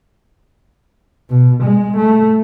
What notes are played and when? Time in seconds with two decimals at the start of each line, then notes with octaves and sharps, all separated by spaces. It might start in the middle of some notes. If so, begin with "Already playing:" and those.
1.30 B2
1.63 G#3
1.97 A3